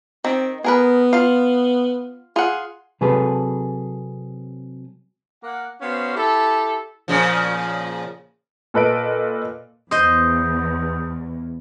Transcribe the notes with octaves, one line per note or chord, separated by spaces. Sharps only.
D#3 C4
B3 G#4 A#4 B4
F4 F5
F4 G#4 F#5
C3 F#3 G#4 A4 B4
A#3 F#5
B3 C#4 F#4 C5 F5
E4 G4 A4
A#2 C#3 F3
A#2 A4 B4 D#5 D7
E2 C5 D#5 D#6 G6